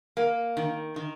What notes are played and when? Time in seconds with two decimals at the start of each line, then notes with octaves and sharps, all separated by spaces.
0.17 A#3
0.57 D#3
0.96 D#3